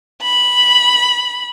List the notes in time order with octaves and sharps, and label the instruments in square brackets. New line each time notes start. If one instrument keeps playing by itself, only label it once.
[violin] B5